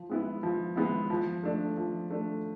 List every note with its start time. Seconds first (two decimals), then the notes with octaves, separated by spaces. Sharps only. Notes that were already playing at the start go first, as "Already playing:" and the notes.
Already playing: F3
0.10 G#3 B3 E4
0.43 F3
0.76 G#3 B3 E4
1.10 F3
1.43 A3 D4
1.77 F3
2.11 A3 D4